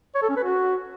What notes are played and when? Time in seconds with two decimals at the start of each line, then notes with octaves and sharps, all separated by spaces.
0.15 C#5
0.22 A4
0.29 C#4
0.37 B4
0.44 F#4